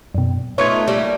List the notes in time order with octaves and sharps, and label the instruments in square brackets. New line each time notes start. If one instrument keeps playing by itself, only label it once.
[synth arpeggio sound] F#2 B2
[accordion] A3 [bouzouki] B3 D#4 F4 [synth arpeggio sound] C#5 C#6 G#6
[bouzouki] G3 A#3